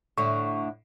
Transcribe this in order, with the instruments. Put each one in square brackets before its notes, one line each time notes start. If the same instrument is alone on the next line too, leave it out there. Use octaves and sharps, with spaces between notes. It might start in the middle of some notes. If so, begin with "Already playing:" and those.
[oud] A2 D3 [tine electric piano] C#6